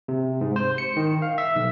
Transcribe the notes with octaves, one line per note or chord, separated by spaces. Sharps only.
C3
G#2
C5
C#7
D#3
F5
E5
B1